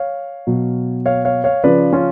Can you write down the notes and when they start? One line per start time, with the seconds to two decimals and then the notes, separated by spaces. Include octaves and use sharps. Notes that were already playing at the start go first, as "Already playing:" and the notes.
Already playing: C#5 F5
0.47 B2 F#3
1.06 C#5 F5
1.25 C#5 F5
1.44 C#5 F5
1.64 C#3 F3 B4 D5
1.93 C#4 F4